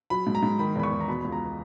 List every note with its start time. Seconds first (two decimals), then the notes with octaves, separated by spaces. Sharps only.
0.10 F#3 B5
0.27 G#2
0.35 A#5
0.43 G#2
0.59 D#3 B5
0.76 E2 B5
0.83 C#6
0.92 E2
1.01 A#5
1.08 B2 B5
1.21 C#2 B5
1.32 A#5